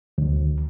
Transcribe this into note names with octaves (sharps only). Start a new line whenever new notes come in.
D2